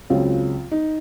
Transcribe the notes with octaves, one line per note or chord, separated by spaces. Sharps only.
C#2 C#3 F#3 C4 F4
D#4